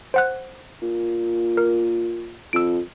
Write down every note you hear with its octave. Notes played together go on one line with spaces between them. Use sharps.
C5 F#5 F#6
A#2
A#4
F2 E6 D7